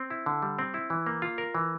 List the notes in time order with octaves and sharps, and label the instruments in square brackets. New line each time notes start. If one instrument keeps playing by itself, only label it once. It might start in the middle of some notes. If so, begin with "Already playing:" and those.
Already playing: [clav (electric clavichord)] C4
E4
D3
G3
C4
E4
E3
A#3
F4
A#4
E3